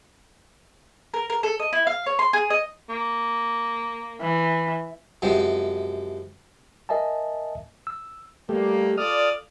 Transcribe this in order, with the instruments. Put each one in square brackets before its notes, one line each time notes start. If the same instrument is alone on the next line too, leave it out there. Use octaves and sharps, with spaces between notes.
[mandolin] A#4
A#4
A4
D#5
E4
F5
C#5
C6
G#4
D#5
[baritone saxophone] A#3
[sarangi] E3
[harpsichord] F#2 C3 F3 G#3
[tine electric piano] A#4 D#5 E5 G#5 A5
E6
[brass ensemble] G3 A#3 [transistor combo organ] A3 G4
[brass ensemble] F4 A4 D5 [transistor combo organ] D#6 F6